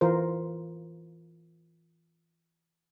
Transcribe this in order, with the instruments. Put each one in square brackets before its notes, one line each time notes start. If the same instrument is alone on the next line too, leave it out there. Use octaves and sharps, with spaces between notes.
[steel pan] E3 F4 A#4 C5